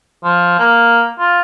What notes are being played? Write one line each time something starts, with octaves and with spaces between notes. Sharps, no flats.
F3
A#3
F4